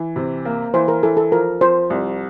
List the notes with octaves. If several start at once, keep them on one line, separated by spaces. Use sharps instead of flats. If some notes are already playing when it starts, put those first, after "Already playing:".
Already playing: E3
C3
A#3
E3 C5
A#4
E3 A4
A4
F3 A#4
F3 C5
C2